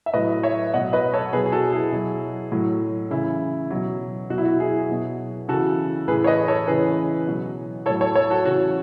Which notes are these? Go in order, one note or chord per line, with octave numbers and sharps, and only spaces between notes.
E5
A2 F#3 B4 D#5
C#5 E5
B2 F#3 D#5 F#5
B4 D#5
A4 C#5
B2 F#3 G#4 B4
G#4
F#4 A4
E4 G#4
B2 F#3
A2 F#3
C#3 E3 E4
B2 F#3
B2 F#3 F#4
E4
F#4
E4 G#4
B2 F#3
C#3 E3 F#4 A4
A2 E3 G#4 B4
C#5
B4 D#5
A4 C#5
C#3 E3 G#4 B4
B2 F#3
A2 F#3 A4 C#5
A4 C#5
A4 C#5
F#4 A4
C#3 E3 F#4